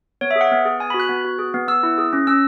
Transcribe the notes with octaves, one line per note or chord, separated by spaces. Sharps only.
B3 C#5
E5
G#4
F#5
B3
G#4
B3 G#5
B5
F#4
F#6
B3
F#4
G#4
B3
B3 E6
E4
G#4
C#4
C#4 E6